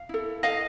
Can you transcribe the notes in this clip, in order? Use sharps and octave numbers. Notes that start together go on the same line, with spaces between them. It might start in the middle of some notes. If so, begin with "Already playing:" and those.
Already playing: F5
E4 A4
D#5 F5